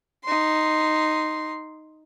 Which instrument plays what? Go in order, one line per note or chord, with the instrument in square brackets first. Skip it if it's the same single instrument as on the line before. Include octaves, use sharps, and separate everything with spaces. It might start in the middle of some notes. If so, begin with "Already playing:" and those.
[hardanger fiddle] D#4 C6